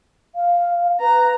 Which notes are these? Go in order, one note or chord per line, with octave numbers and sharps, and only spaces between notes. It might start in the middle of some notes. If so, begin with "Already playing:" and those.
F5
B4 A#5